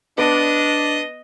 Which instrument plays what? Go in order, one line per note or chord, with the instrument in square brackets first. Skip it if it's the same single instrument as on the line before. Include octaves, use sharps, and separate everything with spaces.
[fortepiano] B3 [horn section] D4 [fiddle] D#5